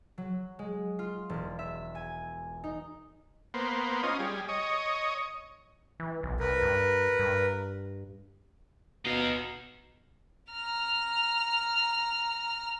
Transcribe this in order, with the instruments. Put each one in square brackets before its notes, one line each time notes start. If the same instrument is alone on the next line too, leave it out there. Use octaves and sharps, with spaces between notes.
[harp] F#3
G#3
F4
E1
E5
G#5
D#4
[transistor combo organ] A#3 B3 C5
C#4 F4 D#5
G3 G#4
C#5 D#5
[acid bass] E3
B1
[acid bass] C2 [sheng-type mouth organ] A#4 B4
[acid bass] G2
G2
[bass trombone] B2 [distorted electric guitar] D#4 F5
[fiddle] A#5 F6